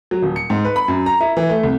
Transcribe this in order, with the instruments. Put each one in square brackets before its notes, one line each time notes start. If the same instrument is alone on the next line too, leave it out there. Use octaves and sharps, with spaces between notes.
[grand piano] F#3
D#1
C#7
G#2
B4
B5
F#2
A#5
E4
E3
A3
C2